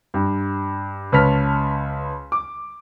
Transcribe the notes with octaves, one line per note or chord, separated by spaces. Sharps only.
G2
C#2 B4 C#5 A5 F6 B6
D6